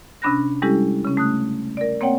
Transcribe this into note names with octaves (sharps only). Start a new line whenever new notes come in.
C3 C#4 D4 B5 F#6 A#6
G3 G#3 C#4 E4 G4 A4
C#3 C#4
A3 D#6 F#6
A#4 D5
A#3 C4 C#5 F#5 G5